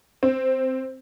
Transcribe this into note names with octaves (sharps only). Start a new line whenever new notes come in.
C4